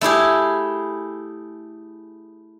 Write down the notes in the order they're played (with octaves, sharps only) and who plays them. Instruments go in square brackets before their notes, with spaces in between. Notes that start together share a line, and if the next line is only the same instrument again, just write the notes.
[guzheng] A3 E4 G4 G#4